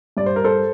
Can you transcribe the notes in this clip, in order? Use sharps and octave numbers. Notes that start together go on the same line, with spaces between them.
G2 D5
C5
A#4
A4 C5